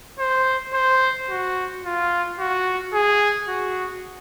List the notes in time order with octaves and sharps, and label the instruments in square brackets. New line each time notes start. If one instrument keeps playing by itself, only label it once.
[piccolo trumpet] C5
C5
F#4
F4
F#4
G#4
F#4